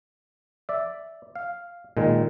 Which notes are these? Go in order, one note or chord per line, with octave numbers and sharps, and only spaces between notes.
D5 E5
F5
A#2 D#3 G#3